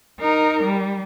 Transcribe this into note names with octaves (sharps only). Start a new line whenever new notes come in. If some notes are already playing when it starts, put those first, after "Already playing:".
D#4 A#4
G3